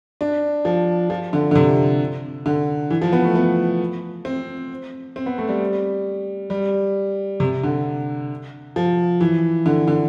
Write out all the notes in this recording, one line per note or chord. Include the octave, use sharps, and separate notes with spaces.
D4
F3
F3
D3
D3
C3
D3
E3
F3
B3
A3
B3
C4
C4
B3
A3
G3
G3
C3
D3
F3
E3
D3
D3